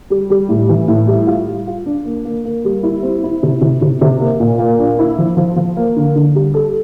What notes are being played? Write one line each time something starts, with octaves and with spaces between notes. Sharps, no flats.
G3
G3
A2
E3
A2
G3
F4
G3
F4
D4
A#3
A#3
A#3
G3
E4
C4
E4
C3
C3
C3
C3
A#3
A#2
A#3
D4
E4
F3
F3
F3
A#3
D3
D3
G3
A4